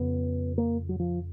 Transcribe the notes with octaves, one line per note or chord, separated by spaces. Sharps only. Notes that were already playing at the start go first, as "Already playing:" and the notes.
Already playing: F2 C#3 B3
A#3
F#3
F3